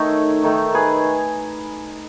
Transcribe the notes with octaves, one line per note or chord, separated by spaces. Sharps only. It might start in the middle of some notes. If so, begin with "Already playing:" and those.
Already playing: D#3 A3 D#4 A4 C#5
D#3 A3 D#4
G#4 B4